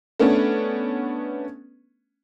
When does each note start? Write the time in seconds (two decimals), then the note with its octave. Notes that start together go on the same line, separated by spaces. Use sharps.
0.20 A3 B3 C#4 D4